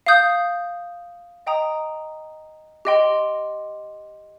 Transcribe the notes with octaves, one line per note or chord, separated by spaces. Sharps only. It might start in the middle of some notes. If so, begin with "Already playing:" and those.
F5 D#6 G6
D#5 G5 A#5 D#6
G4 D#5 G5 C6